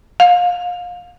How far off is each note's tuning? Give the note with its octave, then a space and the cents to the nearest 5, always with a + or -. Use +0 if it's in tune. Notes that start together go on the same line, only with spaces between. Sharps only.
F5 +30